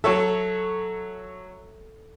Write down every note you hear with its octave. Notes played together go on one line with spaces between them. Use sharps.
F#3 A4 C#5 E5